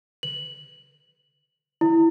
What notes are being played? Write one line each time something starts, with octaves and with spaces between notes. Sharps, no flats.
F#7
E4